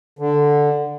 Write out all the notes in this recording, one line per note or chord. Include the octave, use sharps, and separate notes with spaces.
D3